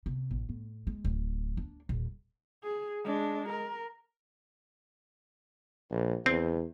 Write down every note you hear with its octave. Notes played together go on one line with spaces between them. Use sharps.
C3
A1
A2
G#3
D1
D4
D#1
G#4
G#3 D4
A#4
A#1
E2 C4